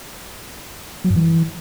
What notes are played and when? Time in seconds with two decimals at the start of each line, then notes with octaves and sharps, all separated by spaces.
1.04 F#3
1.10 G2
1.16 E3